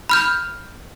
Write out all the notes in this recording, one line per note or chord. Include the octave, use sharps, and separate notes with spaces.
B5 F6 G6